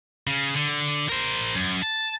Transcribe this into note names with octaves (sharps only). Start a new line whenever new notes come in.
C#3
D3
A#4 C5
F#2
A5